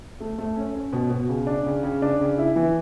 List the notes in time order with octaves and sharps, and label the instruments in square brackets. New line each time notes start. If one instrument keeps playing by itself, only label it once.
[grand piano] A3
A3
C#4
C#4
B2
B2
C#3
D4
C#3
C#3
D4
C#3
E4
E3